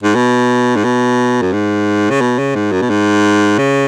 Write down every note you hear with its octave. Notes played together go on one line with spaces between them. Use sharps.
G#2
B2
G#2
B2
F#2
G#2
C#3
B2
C#3
G#2
F#2
B2
G#2
C#3